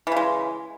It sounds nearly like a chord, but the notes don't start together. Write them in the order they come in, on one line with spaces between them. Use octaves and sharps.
E3 C#3 G#3